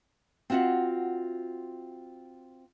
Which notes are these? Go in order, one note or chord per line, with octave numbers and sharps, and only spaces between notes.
C4 F4 F#4 E5 F#5